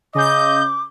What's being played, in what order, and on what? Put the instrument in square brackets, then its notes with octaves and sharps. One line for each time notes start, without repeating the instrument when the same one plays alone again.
[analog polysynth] C#3 G6 [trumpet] D#5 [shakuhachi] D6